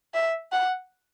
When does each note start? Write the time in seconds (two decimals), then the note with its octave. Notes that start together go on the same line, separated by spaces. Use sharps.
0.14 E5
0.52 F#5